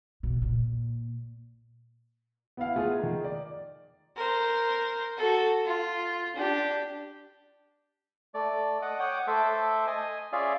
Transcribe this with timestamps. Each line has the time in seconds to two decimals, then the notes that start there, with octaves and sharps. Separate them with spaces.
0.23 B2
0.42 A#2
2.57 B3 E4 F5
2.76 A3 B3 F4 G#4
2.99 D#3 D#4
3.24 D5
4.16 A#4 C5
5.17 F#4 A4
5.65 F4
6.35 D4 G4
8.34 A3 D5
8.82 D#5 F#5 D6
9.00 C#5 F#5 G5 D6 D#6
9.27 A3 A4 C5 E5 D6
9.87 D#5 G#5
10.33 C#4 F4 G#4 D5 E5 F5